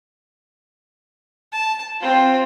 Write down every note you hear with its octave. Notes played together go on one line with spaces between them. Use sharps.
A5
C4 F4